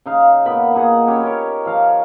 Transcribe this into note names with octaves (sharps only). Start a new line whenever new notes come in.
C#3 D#4 F5
A#2 A#3 B3 B5
A#3 D#4 G#4 F#5
C#4 G4 B4
C#4 A#4 C#5
F3 F5 A#5